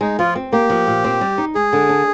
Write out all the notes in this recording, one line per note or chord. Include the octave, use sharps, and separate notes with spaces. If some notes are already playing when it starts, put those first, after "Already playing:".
G#3 D#4
F3 F4
C4
A#3 G4
F3
A#2
C4
G3
D#4
G#3 G#4
D3
D4